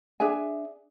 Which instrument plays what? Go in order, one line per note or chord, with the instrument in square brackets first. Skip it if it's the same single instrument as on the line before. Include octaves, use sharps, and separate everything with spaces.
[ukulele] D4 G#4 E5 G#5